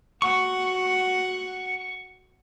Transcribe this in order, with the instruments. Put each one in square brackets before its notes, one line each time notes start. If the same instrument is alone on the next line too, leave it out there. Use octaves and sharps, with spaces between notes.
[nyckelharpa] F#4 F#5 [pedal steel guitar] C#6